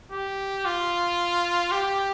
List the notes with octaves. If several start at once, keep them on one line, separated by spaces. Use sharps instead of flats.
G4
F4
G4